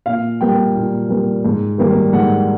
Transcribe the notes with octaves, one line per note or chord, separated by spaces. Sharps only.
A#2 F5
G3 A#3 G5
A#2
G3 A#3
G#2
D#3 G3 A#3
G#2 F#5